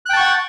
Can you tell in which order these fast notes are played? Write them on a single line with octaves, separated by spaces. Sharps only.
F#6 G5 A5 C#6 F#5